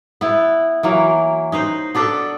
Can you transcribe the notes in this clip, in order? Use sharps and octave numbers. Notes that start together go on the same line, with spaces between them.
B3 E4
E3 F#3 A#3
D#4 B4 C5
B3 D4 A4 B4